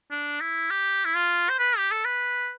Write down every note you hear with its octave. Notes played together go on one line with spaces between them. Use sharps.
D4
E4
G4
E4
F4
C5
B4
G4
A4
B4